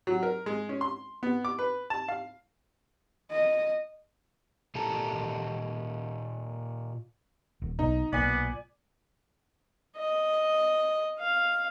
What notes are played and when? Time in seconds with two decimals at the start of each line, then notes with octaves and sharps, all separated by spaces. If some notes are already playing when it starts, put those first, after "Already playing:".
0.07 F#3
0.23 A#4
0.46 G#3
0.69 C#4
0.81 C6
1.23 B3
1.45 D6
1.59 B4
1.90 A5
2.08 F5
3.31 D#5
4.75 A#2 G4 A4 A5 A#5
7.62 D#1
7.79 B1 B2 D#4
8.13 B1 A#2 B3 D5 G#5
9.97 D#5
11.19 F5